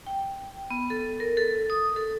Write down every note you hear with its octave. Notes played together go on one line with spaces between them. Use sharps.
G5
B3
A4
A#4
A4
D#6
A4